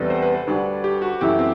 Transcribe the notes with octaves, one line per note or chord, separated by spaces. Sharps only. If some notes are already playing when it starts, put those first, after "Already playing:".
Already playing: E2 C3 G3 D4 A4 B4
C5
B4
B4
D2 D3 G3 D4
G4
F#4
F#2 E3 A3 E4 G4
C4